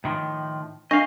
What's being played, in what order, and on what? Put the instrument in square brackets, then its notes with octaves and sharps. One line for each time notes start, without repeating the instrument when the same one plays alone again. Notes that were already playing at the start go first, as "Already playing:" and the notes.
[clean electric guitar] A2 D#3 F3
[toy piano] D4 C#6 [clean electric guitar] D#5 F5